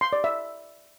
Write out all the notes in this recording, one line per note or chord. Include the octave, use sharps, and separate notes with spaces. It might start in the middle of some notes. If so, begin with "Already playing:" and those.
C6
D5
E5